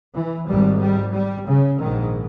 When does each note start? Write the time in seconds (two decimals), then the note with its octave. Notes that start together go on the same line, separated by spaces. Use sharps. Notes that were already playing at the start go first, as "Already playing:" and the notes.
0.14 E3
0.48 G#1 G#2 G3
0.80 G3
1.13 G3
1.47 C#3
1.80 A#1 G#2 D#3